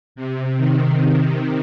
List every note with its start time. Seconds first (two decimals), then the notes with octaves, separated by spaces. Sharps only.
0.16 C3
0.56 D#3